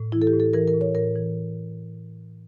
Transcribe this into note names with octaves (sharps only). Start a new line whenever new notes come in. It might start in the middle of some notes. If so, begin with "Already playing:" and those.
Already playing: A2
E3 E4
A4
G4
A2
A4
E3 A#4
A#4
A2
C#5
A2 A#4
E3